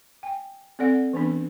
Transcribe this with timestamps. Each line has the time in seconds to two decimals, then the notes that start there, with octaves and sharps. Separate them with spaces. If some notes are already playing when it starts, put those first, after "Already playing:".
0.23 G5 G#5
0.79 C4 A4 D5 F#5
1.13 E3 B3 C#4 D4